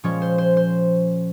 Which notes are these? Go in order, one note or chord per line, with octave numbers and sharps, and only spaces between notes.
A#2 F3 G#3 C#4 C#5
C5
C5
C5